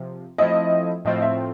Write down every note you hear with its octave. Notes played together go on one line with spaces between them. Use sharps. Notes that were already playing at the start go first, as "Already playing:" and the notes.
Already playing: C3 F3
F3 A3 C4 E4 D#5
A2 F3 A3 C4 F4 D#5
E5